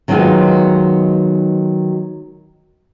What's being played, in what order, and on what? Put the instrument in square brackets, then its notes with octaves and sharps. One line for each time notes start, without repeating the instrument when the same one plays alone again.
[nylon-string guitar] D#3 F#3 G#3 B3 D#4 F4